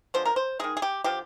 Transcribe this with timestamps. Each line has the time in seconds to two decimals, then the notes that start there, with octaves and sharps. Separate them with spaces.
0.14 D3 F3 G#3 C5
0.25 A#4
0.36 C5
0.59 D#3 G#3 G#4
0.77 G#4
0.82 G4
1.04 D3 F3 G#3 G4